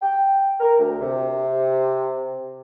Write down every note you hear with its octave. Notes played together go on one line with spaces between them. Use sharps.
G5
A#4
D2
C3